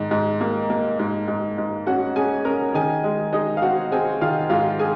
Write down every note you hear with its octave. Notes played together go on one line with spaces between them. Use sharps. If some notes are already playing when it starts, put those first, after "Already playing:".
Already playing: G#2 D#3
G#2
A#3
A#3
G#2
G#2
G#2
C#4 F#4 F#5
C#4 G#4 G#5
C#4 A#4 A#5
D#3 G#4 G#5
G#3
G#3 D#4 D#5
F5
C4 F#4 F#5
C4 G#4 G#5
D#3 F4 F5
G#2 F4 F5
G#4 G#5